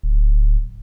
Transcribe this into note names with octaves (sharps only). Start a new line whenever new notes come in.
D1